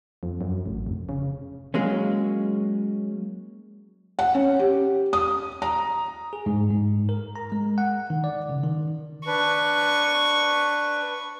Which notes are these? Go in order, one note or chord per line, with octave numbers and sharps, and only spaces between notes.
F2
F#2
A1
F1
C#3
F#3 G#3 A#3 C#4
F#5
C#4
G4
D#6
A#5
G#4
G#2
G#2
A#4
A#5
G#3
F#5
D#3
D5
C#3
D#3
D4 B4 C#6